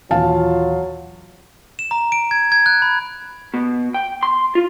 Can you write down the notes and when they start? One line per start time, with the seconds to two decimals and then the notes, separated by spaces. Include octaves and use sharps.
0.11 D#2 A#2 E3 F#3 F4 F5 A5
1.79 E7
1.91 A#5
2.12 D7
2.31 G#6
2.52 G#6
2.66 F#6
2.82 B5
3.54 B2
3.94 G5
4.23 C6
4.55 F4